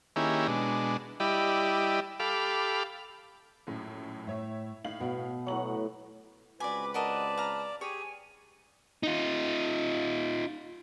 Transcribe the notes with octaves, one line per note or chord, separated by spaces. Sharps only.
D#3 A#3 C#4 E4 G4 G#4
B2 G#3 D4
G3 E4 G4 D5 D#5 B5
G4 A4 F5 B5 D6
A#1 F#2 A2
A2 E4 C#5 E5
A2 D#4 F5 F#7
B2 B3
A2 F#3 F#5 F#7
C#2 C4 F#4 B4 D5 G#5 B5 D6
F#4 A#4 D5 D#5 A5
F5 A#5
G4 G#4 C#5 G#5
D#4 F4